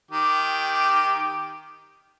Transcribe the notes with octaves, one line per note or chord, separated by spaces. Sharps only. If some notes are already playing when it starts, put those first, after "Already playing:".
D#3 G4 D6